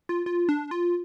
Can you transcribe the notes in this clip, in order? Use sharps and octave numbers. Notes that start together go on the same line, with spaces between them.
F4
F4
D4
F4